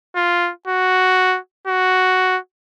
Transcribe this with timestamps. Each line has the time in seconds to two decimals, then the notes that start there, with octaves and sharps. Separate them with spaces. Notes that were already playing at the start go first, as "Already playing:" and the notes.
0.16 F4
0.67 F#4
1.67 F#4